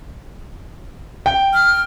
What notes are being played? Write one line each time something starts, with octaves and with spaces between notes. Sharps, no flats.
G5
F6